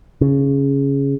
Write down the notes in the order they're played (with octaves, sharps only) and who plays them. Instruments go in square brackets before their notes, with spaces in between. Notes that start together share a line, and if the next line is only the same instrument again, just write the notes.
[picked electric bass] C#3